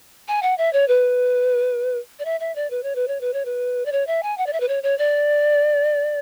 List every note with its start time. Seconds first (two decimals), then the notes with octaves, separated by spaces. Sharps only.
0.28 G#5
0.43 F#5
0.58 E5
0.73 C#5
0.88 B4
2.19 D5
2.25 E5
2.40 E5
2.56 D5
2.70 B4
2.83 C#5
2.95 B4
3.08 C#5
3.21 B4
3.33 C#5
3.45 B4
3.86 D5
3.92 C#5
4.07 E5
4.23 G#5
4.38 F#5
4.47 D5
4.53 E5
4.60 B4
4.68 C#5
4.83 C#5
4.98 D5